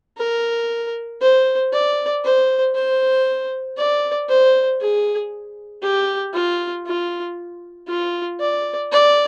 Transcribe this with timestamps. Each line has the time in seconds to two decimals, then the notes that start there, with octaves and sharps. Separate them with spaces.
0.18 A#4
1.21 C5
1.73 D5
2.24 C5
2.75 C5
3.77 D5
4.29 C5
4.81 G#4
5.83 G4
6.34 F4
6.86 F4
7.88 F4
8.40 D5
8.92 D5